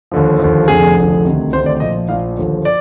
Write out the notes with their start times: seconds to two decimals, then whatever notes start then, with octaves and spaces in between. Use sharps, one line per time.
0.12 D#2 D3 F3
0.39 D#2 D3 F3
0.68 F1 F2 D3 G#4
0.96 F1 F2 D3
1.24 D2 C3 D#3
1.53 D2 C3 D#3 C5
1.66 D5
1.80 A#1 A#2 F3 D#5
2.09 A#1 A#2 F3 F5
2.38 D#2 D3 F3
2.65 D5